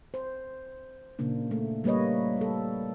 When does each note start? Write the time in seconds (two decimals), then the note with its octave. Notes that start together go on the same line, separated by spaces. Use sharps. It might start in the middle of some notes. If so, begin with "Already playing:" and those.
0.14 C5
1.19 A#2 C#3 A#3 D4
1.51 A3
1.84 G3 A#3 B4 C#5 D#5
2.37 G3 A4